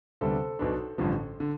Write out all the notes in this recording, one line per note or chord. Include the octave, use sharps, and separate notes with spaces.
D2 C3 G3 B3 D4 A4 C5
B1 B2 B3 D4
A1 G2 D3 F3
D3